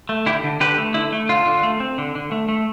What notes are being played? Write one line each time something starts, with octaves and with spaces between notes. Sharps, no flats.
A3
D3 E4 G4
D3
D3 G4 B4
A3
D3 E4
A3
D3 F4
D3
A3
C4
D3
D3
A3
A3